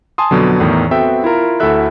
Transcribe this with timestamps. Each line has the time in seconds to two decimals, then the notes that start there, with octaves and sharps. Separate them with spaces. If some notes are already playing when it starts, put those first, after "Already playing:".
0.18 G#5 A5 C6 D#6
0.31 F2 B2 D3 F#3
0.60 E2 A2 D#3
0.91 B3 C4 F#4 A4 E5 G5
1.24 E4 F4 A#4
1.60 D2 E4 F#4 A4 E5 F#6